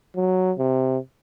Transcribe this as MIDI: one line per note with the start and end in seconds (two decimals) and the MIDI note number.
0.15 0.52 54
0.58 0.98 48